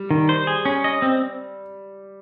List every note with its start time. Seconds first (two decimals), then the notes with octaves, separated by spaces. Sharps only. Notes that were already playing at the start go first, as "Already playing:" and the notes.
Already playing: G3
0.11 D#3
0.29 C5
0.47 G#4
0.65 C#4
0.84 D#5
1.02 C4